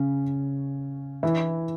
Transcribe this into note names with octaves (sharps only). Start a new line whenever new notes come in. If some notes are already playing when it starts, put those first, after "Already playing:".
Already playing: C#3 C#4
E3 E4